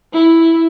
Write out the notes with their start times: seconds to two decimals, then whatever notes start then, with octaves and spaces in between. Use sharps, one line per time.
0.13 E4